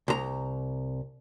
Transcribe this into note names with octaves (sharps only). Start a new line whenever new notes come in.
C2 A#5